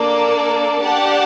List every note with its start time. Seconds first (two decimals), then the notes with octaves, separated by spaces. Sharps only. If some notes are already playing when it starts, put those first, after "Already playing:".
Already playing: A#3 D4 A4 D5
0.81 D4 G4 D5 F#5 A5